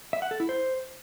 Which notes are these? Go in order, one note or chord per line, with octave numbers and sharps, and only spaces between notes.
E5
F#5
A4
E4
C5